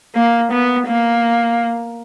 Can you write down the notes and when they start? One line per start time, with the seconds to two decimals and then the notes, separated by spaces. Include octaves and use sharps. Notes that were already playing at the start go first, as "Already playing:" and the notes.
0.15 A#3
0.52 B3
0.87 A#3